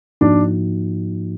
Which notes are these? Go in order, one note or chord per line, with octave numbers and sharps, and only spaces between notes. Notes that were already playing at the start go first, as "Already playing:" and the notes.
G#2 F3 A#3 D4 D#4 F#4